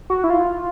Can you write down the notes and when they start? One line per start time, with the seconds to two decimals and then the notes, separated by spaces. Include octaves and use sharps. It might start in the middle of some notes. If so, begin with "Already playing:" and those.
0.10 F#4
0.24 E4
0.30 F4